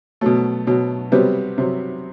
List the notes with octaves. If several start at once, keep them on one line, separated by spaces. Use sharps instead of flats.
B2 F#3 A3
B2 F#3
C3 F#3 G3 B3
C3 F#3